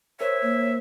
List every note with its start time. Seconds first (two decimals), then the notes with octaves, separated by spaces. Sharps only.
0.21 A#4 C5 C#5 E5
0.42 A#3